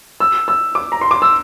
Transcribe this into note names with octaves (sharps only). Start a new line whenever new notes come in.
E6
E6
D6
A#5
C6
D6
E6